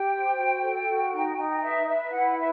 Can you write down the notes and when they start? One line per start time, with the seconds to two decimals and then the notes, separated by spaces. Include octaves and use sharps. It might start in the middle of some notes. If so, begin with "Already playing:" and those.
Already playing: G4 G5
0.11 C5
0.36 F#4
0.61 A4
0.87 F#4
1.12 D#4
1.37 D#4
1.61 B4 E5
1.87 B4 E5
2.12 E4 F#5
2.37 E5